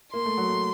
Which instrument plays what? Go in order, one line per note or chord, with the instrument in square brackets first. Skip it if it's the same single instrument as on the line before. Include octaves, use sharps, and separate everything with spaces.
[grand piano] A#3 [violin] C6
[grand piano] A3
F#3
A3